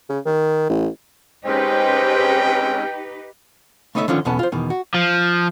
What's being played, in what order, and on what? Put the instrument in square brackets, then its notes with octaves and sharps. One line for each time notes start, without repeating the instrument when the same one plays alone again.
[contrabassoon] C#3
D#3
A1
[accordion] G#3 C4 C#4 [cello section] D#4 G4 B4 [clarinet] C5 [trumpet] G5
[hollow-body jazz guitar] A3 B3 D#4 C#5 D#5 E5
D3 D#3 F3 C#4 F4
B1 E2 B2 B3 C#4 A5
F4 C5
E2 B2 D#3
F#4
[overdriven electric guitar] F3